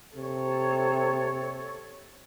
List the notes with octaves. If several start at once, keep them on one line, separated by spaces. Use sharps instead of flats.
C3 A4 C#5